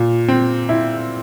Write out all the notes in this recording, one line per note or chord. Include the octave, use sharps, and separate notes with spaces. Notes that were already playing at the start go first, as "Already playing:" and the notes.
Already playing: A#2
C4
E4